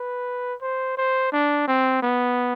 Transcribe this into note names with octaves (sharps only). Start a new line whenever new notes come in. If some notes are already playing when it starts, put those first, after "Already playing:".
Already playing: B4
C5
C5
D4
C4
B3